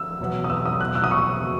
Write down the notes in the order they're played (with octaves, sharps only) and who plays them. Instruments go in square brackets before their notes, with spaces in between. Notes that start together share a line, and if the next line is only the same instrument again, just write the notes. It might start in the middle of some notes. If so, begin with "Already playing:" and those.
Already playing: [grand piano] E6
[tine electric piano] E2 B2 F#3 B3
[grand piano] D#6
E6
D#6
F#6
E6
D#6
C#6
[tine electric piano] C#3 G#3 C#4 F#4